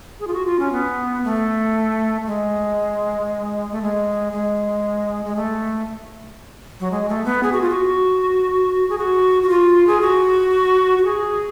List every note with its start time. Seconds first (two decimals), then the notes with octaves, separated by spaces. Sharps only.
0.20 G#4
0.27 F4
0.34 F#4
0.46 F4
0.59 C#4
0.72 B3
1.24 A3
2.27 G#3
3.72 A3
3.82 G#3
4.33 G#3
5.25 G#3
5.36 A3
6.80 F#3
6.91 G#3
7.09 A3
7.25 B3
7.43 G#4
7.52 F#4
7.61 F4
7.70 F#4
8.89 G#4
8.98 F#4
9.43 F#4
9.49 F4
9.87 G#4
10.01 F#4
10.98 F#4
11.05 G#4